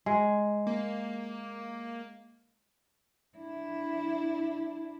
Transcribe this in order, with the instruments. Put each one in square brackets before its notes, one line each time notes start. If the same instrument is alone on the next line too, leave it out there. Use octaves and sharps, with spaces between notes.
[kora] G#3
[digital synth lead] A#3
[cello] D4 E4